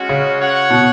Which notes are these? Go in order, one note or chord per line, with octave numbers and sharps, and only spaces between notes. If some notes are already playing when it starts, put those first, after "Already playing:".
Already playing: G#3 C#4 F#4
C#3
F#4 C#5 F#5
B2